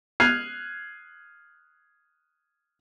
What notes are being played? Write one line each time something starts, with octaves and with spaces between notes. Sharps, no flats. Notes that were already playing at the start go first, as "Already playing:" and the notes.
F6 F#6 G#6 C7 D#7 F7